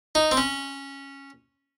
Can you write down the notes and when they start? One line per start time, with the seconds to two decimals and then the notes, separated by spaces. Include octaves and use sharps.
0.15 D#4
0.31 C4
0.37 C#4